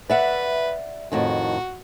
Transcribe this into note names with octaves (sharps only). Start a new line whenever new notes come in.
B4 D5 E5 F#5
F2 A2 D#3 F#4